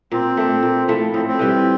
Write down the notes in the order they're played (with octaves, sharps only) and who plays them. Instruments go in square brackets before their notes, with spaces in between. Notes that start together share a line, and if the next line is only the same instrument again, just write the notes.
[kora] A#2 [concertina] C4
[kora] A3 D4
A#2
F3 A3 E4
[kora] A2 [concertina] C4
[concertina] C4
[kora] E3 G3